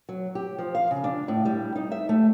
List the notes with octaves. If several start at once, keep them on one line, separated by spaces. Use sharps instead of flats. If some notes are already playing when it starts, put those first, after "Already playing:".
F#3
G4
F3
F5
C#3
D4
A2
G3
D#4
E5
A3